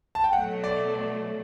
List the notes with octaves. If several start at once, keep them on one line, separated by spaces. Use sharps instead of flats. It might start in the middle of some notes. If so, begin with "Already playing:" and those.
A5
G5
B2 F#3 A3 F#5
D5
D5